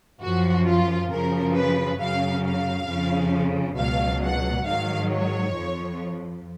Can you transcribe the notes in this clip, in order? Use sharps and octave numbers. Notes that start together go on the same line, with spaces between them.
F#2 F3 F#4
F4
F#2 C#3 F3 A#4
B4
F#2 C#3 F#3 F5
F5
F2 C#3 F3
C#2 B2 F#3 F5
F#5
G#2 D#3 F#3 F5
C#5
F2 F3